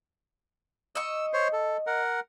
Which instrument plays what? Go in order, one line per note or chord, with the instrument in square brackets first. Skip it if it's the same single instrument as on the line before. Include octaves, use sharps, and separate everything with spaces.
[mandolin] D#5 C#6 [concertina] E6
[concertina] C5 C#5
A4
A#4 F#5